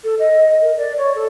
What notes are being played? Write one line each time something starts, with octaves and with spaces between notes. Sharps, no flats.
A4
D#5
A#4
D5
C#5
A4